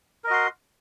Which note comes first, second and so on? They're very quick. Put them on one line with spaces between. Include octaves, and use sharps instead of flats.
A#4 D#5 F#4 C6